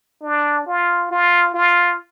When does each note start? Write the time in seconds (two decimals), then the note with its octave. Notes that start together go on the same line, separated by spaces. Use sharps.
0.22 D4
0.66 F4
1.11 F4
1.54 F4